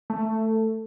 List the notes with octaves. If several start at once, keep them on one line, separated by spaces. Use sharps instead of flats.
A3